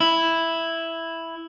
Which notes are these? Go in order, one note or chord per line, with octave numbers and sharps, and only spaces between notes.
E4